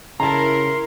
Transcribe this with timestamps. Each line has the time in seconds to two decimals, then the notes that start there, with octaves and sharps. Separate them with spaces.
0.20 C#3 E4 A#4 A5 A#5 C6